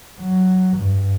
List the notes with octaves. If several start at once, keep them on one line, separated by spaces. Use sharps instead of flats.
F#3
G2